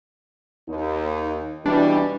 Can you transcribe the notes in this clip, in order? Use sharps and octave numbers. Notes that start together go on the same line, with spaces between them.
D#2 D#4
B2 E3 G3 D4